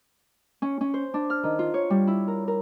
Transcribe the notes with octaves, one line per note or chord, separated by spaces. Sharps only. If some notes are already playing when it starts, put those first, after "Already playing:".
C#4
C#4
C5
D4
F6
D#3
F4
C#5
G3
E4
A#4
A#4